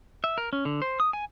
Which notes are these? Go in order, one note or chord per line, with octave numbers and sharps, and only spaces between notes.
E5
A#4
C#4
D3
C5
D#6
G#5